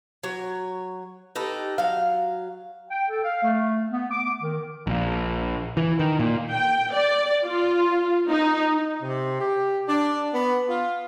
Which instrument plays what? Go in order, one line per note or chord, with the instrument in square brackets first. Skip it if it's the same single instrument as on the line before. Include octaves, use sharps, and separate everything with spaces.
[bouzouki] F#3 C#5
D#4 G4 A4 B4
F#3 F5
[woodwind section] G5
A4
F5
A3
B3
D6
D#3
[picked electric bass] A#1
E3
D#3
A#2
[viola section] G5
D5
F4
D#4
[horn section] C3
G4
D4
B3
F4